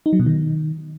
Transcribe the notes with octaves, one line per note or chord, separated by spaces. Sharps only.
D#4
F#3
B2
D#3